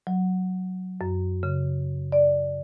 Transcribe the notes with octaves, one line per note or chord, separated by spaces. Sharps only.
F#3
F#2
C#3
D5